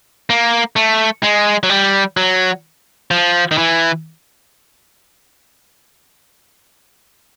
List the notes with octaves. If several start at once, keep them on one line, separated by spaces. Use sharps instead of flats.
A#3
A3
G#3
F#3
G3
F#3
F3
D#3
E3